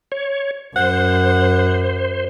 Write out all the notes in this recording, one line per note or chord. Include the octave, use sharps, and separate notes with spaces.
C#5
F#2 C5 F#5